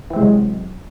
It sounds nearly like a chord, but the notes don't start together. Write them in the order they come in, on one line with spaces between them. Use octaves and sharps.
E3 C4 G#3 C3 F#3